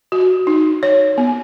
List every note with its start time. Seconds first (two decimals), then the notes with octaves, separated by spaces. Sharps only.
0.12 F#4
0.47 D#4
0.83 C#5
1.18 B3